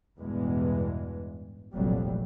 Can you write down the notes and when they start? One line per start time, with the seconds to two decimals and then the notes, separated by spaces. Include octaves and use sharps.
0.18 A1 E2 G2 B2 E3 G#3
1.73 F1 A#1 F2 F#3 G3